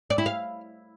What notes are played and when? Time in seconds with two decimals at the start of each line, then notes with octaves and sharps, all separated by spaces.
0.10 D5
0.18 E4
0.26 F5